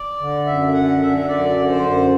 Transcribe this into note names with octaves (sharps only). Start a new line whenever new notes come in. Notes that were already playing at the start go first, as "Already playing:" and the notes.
Already playing: D5
D3
F#2 E5
D3 F#5
D3 E5
F#2 D5
D3
C5
F#2